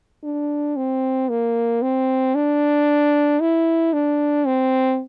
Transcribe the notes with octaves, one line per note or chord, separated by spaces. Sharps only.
D4
C4
A#3
C4
D4
E4
D4
C4